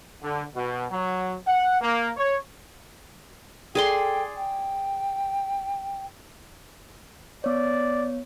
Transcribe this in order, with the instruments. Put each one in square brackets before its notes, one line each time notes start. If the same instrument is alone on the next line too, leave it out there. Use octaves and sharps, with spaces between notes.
[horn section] D3
B2
F#3
F#5
A#3
C#5
[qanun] G#4 D5 C6 [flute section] A4 G5
[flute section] G5
[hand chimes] B3 C#5 [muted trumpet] D5